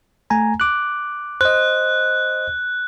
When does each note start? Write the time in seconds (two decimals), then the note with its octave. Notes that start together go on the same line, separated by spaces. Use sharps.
0.30 A3 G#5 A#5
0.60 D6 F#6
1.41 C5 D#5 F#6